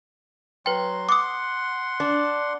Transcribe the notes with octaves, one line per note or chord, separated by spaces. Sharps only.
F#3 B4 G5 C6
F#5 C6 D6 D#6
D4